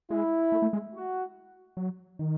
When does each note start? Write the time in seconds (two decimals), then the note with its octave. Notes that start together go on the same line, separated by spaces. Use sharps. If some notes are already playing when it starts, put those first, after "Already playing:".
0.10 G#3 E4
0.52 A3
0.62 A3
0.73 G#3
0.94 F#4
1.77 F#3
2.19 D#3